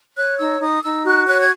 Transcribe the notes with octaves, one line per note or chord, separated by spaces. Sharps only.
C#5 F#6
D#4 E6
D#4 D#6
D#4 E6
F#4 F#6
C#5 F#6
G#6